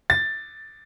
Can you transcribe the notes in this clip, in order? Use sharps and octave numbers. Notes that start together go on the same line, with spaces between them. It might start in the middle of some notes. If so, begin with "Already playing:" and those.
A6